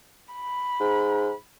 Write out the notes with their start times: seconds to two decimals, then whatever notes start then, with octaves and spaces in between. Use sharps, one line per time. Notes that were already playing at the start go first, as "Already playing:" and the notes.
0.34 B5
0.80 G#2